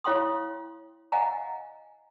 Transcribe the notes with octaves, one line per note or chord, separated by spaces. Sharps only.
E4 C#5 F5 G5 C6 D#6
D#5 F5 F#5 G#5 A#5